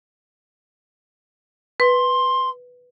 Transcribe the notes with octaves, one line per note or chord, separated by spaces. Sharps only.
B4 C6